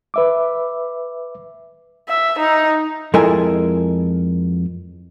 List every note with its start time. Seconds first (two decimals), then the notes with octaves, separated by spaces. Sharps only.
0.14 B4 E5 D6
2.09 E5
2.39 D#4
3.14 F2 G#3 E4 A4 A#4 G#5